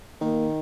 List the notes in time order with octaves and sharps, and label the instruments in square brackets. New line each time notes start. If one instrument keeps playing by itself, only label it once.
[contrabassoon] D#3 [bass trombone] A#3